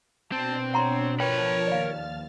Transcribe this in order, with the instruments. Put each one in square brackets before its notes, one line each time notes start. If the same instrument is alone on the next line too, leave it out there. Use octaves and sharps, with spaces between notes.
[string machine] B2 D4 [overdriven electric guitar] C4 [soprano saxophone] A5
[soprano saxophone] C#5 [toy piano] F#5 A#5 C6
[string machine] F3 A5 [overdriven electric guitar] A#4 B5 [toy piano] B4 G5 [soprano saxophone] C#5
[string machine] D#2 F6 A6 [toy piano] D5 F5